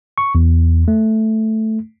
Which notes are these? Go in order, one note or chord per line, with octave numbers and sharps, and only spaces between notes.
C#6
E2
A3